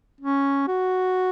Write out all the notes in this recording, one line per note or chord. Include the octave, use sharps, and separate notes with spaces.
C#4
F#4